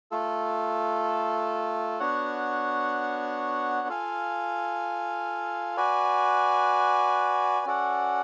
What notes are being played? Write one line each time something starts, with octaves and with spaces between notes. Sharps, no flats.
A3 F4 A4
B3 D4 F#4 C#5 F#5
F4 A4 F5 G#5
F#4 B4 D5 G#5
C#4 F#4 A4 D5 F#5